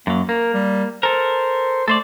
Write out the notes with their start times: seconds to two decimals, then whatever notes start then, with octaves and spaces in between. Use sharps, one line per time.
0.07 F#2 F#3 A#3
0.29 A#3 A#4
0.54 G3
1.03 A4 A#4 C5
1.88 A3 A4 C5 D5